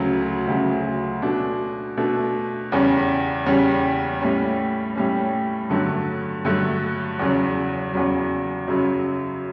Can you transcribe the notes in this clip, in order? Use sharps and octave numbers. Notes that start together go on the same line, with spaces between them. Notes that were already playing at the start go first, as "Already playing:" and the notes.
Already playing: D2 C#3 F#3
D2 C#3 F#3
B2 A3 D4
B2 A3 D4
E2 C#3 G3 C#4
E2 C#3 G3 C#4
A2 G3 C#4
A2 G3 C#4
G2 D3 F#3 A3
G2 D3 F#3 A3
E2 C#3 F#3
E2 C#3 F#3
F#2 C#3 F#3